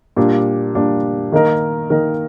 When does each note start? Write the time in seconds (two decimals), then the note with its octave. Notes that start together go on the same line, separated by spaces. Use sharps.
0.17 A#2 G3 D4
0.75 A#2 G3 D4
1.32 D#3 A#3 D#4 A#4
1.90 D#3 A#3 D#4 A#4